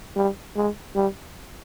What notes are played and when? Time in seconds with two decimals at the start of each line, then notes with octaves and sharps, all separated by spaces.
0.16 G3
0.56 G#3
0.95 G3